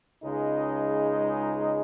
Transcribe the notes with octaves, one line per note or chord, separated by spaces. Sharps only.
C#2 C#3 G#3 D#4 G#4